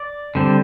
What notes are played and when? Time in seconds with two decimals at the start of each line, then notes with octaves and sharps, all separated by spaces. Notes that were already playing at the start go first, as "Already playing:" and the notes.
Already playing: D5
0.35 D3 G3 C4